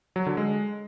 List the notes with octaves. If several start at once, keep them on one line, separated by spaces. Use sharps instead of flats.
F#3
D3
G#3